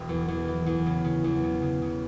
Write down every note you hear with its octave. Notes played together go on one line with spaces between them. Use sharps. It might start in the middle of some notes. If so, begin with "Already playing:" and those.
Already playing: E1
E2
E2
E3
E2
C#3
C#3
E2
C#3
C#3
C#3